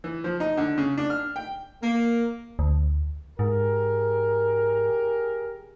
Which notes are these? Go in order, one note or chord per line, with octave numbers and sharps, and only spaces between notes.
E3
F3
D#4
D3
C#3
D4
F6
G5
A#3
D2
G#2 G4 G#4 A#4